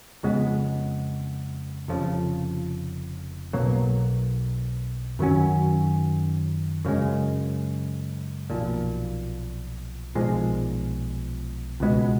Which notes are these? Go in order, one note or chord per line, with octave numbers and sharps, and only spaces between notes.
F2 C#3 G#3 B3
F1 F2 C#3 F3
B1 B2 F#3 A#3
F#2 D#3 F#3 C#4
F#2 C#3 G#3
B1 A#2 F3
B1 A#2 F3 G#3
C#2 B2 G#3 B3